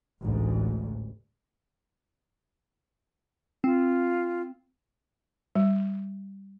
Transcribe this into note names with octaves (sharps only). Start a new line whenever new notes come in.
A1 D2 G#2
C4 F4
G3